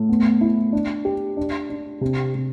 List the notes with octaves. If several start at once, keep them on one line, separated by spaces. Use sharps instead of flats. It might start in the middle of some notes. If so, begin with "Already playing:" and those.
Already playing: A2 A3
B3
E4
D4
G4
D4
D4
C3
C3